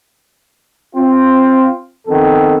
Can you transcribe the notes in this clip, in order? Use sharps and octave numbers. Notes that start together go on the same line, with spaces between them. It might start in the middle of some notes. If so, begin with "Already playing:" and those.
C4 F4
F2 D#3 B3 A4